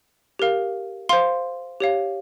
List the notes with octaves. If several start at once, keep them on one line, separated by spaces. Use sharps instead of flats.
G4 A#4 F5
C5 F5 C6
G4 C#5 F5